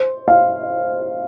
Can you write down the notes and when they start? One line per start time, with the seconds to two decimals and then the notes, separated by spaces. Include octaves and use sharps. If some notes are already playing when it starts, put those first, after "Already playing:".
Already playing: C5
0.28 F5